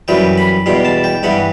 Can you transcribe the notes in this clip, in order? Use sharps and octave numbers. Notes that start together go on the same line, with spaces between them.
F#2 E3 G3 G5
B5
E2 B2 G3 C6
A5
G5
G2 E3 G3 F#5